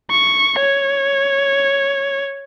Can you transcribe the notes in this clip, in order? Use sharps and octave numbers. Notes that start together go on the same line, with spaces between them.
C#6
C#5